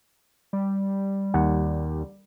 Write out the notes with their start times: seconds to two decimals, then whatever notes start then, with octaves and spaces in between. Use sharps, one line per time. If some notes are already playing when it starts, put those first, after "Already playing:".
0.53 G3
1.34 D#2 F#5